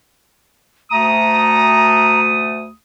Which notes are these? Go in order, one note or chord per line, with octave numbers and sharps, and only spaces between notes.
D2 A3 A#5 D#6